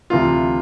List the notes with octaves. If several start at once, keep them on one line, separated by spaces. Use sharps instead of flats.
D2 C3 E3 F4